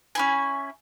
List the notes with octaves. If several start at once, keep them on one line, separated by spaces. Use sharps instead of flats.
C#4 E4 G#5